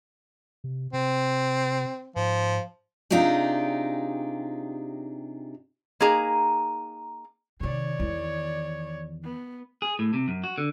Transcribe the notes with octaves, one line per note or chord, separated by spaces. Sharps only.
C3
C3 C4
G#2 F3
C3 D4 D#4 F4 G4 G#4
A#3 D#4 G#4 A#5
C3 D#3 C#5 D5
E2 D#3
B3
G#4
A2
C3
F#2
F#4
D3